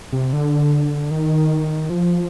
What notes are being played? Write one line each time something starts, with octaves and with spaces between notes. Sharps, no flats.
C3
D3
D#3
F3